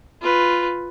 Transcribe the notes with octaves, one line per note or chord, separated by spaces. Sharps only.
F4 B4